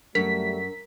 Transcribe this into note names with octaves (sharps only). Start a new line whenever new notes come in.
F#2 G3 A3 A#4 B6